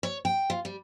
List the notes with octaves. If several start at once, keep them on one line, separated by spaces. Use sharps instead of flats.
C#5
G5
F4
G3